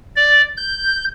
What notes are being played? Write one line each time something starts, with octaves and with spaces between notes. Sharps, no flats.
D5
G6